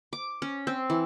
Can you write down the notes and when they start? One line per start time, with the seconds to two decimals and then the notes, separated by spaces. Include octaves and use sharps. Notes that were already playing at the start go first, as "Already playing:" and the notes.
0.13 D6
0.42 C#4
0.67 C4
0.90 E3